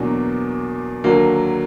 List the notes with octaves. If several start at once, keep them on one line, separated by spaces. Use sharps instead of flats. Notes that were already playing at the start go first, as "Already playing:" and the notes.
Already playing: E2 B2 F#3 A#3 D4
D#2 D3 F#3 A#3